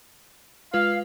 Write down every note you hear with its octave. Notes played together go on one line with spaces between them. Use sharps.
G#3 F4 B4 F5